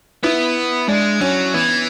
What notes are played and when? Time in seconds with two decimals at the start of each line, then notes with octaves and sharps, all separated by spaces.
0.24 B3 E4
0.88 G#3 D4
1.20 F#3 C#4
1.54 E3 B3